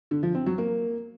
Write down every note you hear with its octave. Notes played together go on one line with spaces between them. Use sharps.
D3
F3
C4
F#3
A#3